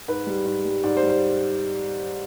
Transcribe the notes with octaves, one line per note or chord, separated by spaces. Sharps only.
G#2 B4
G3
G#2
G3
G#2 D5
C5
G3
C5